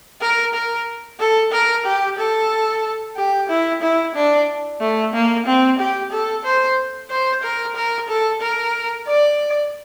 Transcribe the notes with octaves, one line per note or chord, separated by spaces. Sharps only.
A#4
A#4
A4
A#4
G4
A4
G4
E4
E4
D4
A3
A#3
C4
G4
A4
C5
C5
A#4
A#4
A4
A#4
D5